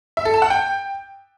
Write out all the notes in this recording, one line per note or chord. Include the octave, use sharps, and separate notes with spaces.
E5
A4
A5
F#5
G5